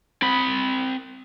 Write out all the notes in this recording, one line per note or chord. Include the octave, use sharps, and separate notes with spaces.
C4 B5